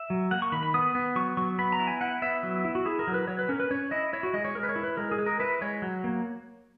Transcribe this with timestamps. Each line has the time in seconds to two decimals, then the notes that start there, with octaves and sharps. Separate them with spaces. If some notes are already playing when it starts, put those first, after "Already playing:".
Already playing: E5
0.10 F#3
0.31 A#3 F#5
0.42 C#6
0.52 D#3 B5
0.63 B5
0.74 B3 D#6
0.95 B3
1.16 F#3 C#6
1.37 F#3 C#6
1.59 B3 B5
1.72 A#5
1.80 E4
1.87 G#5
2.01 E4 F#5
2.22 B3 E5
2.43 F#3
2.65 E4
2.75 F#4
2.85 E4 G#4
2.99 A#4
3.07 F#3
3.14 B4
3.27 F#3 C#5
3.39 B4
3.49 C#4 A#4
3.60 B4
3.71 C#4 C#5
3.91 E4 D#5
4.13 E4 C#5
4.23 F#4
4.33 G#3 D#5
4.45 C#5
4.55 G#3 A#4
4.63 B4
4.69 C#5
4.76 E4
4.83 B4
4.97 G#3 A#4
5.12 G#4
5.19 G#3
5.26 A#4
5.40 E4 B4
5.61 G#3 C#5
5.82 F#3
6.04 A#3